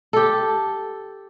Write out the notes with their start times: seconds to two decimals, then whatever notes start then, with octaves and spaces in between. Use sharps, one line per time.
0.13 G4 A4